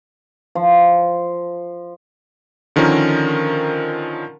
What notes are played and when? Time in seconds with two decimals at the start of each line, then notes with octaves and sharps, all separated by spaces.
0.55 F3
2.76 D3 D#3 F3 C#4 A#4